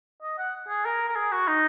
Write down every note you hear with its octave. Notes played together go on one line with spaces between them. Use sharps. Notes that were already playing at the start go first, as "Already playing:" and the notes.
D#5
F#5
G#4
A#4
A#4
G#4
F#4
D#4